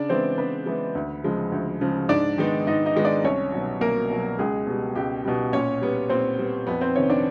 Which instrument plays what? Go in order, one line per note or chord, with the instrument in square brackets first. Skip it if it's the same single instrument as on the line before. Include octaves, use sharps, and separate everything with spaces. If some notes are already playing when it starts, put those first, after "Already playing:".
Already playing: [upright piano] C#3 D4 D5
E3 G#3 B3 C4 C5
C#3 B3 B4
E3 G#3 B3
D2
C#3 F3 G#3
D2
C#3 F3 G#3
G#2 D4 D5
D#3 G#3 B3 D#4
G#2 D#4 D#5
D#4 D#5
D#3 G#3 B3 D#4
D4 D5
C2 C#4 C#5
B2 F#3
C2 A#3 A#4
B2 F#3
C#2 G#3 G#4
B2 G3
C#2 G4
B2 G3
A#2 C#4 C#5
G3 B3
A#2 C4 C5
G3 B3
F2 B3 B4
C4 C5
C3 D#3 C#4 C#5
D4 D5